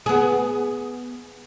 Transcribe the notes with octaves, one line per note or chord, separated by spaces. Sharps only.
B3 G#4